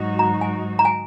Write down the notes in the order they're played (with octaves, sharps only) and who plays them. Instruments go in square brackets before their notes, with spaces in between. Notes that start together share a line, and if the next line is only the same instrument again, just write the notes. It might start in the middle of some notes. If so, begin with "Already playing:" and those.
Already playing: [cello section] G#2 F#3 D#4 F#4
[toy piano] A#5
G#5
A#5
G#5